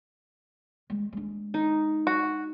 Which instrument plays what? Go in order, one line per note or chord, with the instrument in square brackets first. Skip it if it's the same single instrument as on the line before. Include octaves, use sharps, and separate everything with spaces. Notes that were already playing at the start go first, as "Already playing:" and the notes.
[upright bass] G#3
G#3 D4
[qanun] D#4
[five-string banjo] F#4